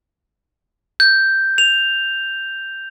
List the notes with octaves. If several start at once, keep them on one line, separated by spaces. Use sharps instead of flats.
G6
F7